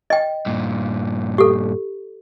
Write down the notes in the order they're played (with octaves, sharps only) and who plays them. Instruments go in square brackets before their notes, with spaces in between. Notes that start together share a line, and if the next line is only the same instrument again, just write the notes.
[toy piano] D#5 G5
[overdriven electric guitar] G2 A#2
[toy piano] G4 A4